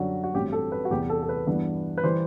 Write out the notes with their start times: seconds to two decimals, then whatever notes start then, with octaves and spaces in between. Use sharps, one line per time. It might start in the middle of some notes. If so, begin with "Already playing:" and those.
Already playing: F#2 D3 G3 F#4
0.24 F#4
0.33 A1 G2 F#3 C4 G4
0.52 A4
0.72 B4
0.85 F#4
0.91 E2 C3 G3 B3 G4
1.09 A4
1.22 A4
1.29 B4
1.47 G2 E3 B3
1.98 B4
2.03 E3 G3 C5